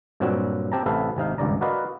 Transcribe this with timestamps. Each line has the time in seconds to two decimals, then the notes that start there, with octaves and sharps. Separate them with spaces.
0.20 G2 A#2 F#3 G3 C4 F#4
0.72 C4 G4 A5 A#5
0.86 A1 C3 A4 B4 E5 F5
1.16 G#1 C3 D#4 F5
1.38 G#1 C#2 G2 D5 A#5
1.61 F#4 A#4 B4 D5 D#5 F5